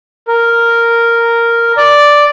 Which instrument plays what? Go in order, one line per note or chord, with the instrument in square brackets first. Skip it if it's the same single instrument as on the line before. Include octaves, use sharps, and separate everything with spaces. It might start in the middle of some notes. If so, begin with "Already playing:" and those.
[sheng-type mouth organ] A#4
D5